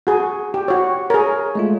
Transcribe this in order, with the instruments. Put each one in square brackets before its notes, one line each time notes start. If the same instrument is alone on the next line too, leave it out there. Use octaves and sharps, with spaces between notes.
[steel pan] F#4 G#4
G4
F#4 C#5
[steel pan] G#4 A#4 [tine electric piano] C#5
[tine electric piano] G#3 A3 F4